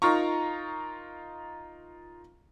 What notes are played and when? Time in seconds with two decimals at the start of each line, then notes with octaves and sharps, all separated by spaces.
0.02 D#4 F4 A#4 A#5 C#6